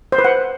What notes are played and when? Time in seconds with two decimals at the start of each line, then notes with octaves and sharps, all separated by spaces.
0.12 C5
0.18 B4
0.24 F#5